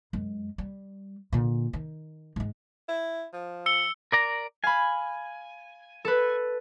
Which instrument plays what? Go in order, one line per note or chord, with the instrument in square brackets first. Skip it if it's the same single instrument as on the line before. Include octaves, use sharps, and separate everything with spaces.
[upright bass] F#2 G#3
G3
A#2 D3
D#3
G#2 G#3
[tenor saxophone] E4
F3
[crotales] E6 C#7 G7
[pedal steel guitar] A#4 D5 A#5
[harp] F5 B5 [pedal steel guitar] G#5
[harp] A4 B4